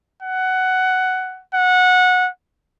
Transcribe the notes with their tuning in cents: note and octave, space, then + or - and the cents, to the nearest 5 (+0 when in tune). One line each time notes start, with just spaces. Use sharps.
F#5 +10
F#5 -20